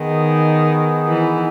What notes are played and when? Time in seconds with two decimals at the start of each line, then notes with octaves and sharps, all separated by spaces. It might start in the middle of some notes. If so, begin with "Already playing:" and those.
Already playing: D#3 B3 D#4 G#4
1.08 E3